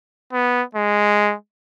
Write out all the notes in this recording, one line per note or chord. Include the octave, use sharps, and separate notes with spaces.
B3
G#3